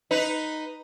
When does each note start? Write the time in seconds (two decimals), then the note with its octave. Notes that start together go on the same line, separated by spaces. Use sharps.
0.11 D#4 B4